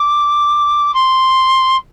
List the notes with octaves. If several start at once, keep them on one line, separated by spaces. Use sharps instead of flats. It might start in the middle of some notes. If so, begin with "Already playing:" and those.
Already playing: D6
C6